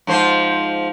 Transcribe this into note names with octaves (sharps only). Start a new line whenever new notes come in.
G#2 F3 C5